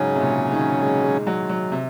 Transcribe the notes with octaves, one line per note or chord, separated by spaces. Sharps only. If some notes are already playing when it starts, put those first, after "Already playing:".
Already playing: G#2 C#3 F#3 C#4
C3
A#2
D#3
G#3
G#3
F#3
F#3
C3